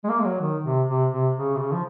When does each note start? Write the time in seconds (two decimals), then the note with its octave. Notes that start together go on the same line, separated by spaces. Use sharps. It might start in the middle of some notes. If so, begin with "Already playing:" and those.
0.04 G#3
0.09 A#3
0.20 G#3
0.25 F#3
0.41 D#3
0.65 C3
0.89 C3
1.12 C3
1.36 C#3
1.55 C3
1.59 C#3
1.73 F3